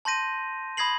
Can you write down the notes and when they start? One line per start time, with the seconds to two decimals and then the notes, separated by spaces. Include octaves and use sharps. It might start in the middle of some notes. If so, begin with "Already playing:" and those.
0.05 A5 C6 G6 A#6 D#7
0.77 B5 D#6 G#6 A#6 C7 F#7